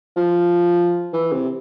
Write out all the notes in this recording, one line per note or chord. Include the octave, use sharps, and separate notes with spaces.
F3
E3
C3